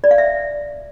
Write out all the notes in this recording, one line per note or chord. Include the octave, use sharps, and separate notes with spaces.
D5
F5
E5